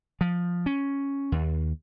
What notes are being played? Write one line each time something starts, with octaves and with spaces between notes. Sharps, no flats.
F3
C#4
D#2